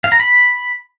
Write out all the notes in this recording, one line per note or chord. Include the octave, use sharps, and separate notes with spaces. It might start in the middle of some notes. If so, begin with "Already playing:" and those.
F5
A#5
B5